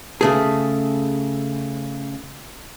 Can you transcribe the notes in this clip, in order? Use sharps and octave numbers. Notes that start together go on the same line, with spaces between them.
C#3 A3 G#4